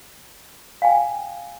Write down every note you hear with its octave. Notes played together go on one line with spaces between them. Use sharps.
F5 G5 G#5